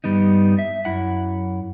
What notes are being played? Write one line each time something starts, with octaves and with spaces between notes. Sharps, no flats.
G2 G3 B3 D#4
E5
F#2 E4 F#5